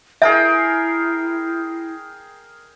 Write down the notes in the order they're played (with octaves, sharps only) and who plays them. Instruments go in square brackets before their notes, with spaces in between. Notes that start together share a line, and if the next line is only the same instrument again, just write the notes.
[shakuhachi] E4 [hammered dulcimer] G#4 A#4 G5 [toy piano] E5